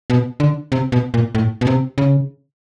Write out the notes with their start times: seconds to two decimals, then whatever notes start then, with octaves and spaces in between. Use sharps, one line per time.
0.10 B2
0.40 D3
0.72 C3
0.92 B2
1.14 A#2
1.35 A2
1.61 B2
1.67 C3
1.98 C#3